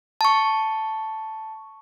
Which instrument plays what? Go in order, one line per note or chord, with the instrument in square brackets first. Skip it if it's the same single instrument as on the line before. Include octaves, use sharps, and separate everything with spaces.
[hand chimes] A5 C#6